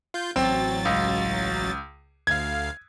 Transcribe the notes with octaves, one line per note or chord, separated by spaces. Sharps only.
F4 G6
A1 F#3 C4 A6
C#2
D2 F5 G#6